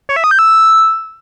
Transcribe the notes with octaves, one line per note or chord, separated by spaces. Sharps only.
C#5
E5
D#6
G6
E6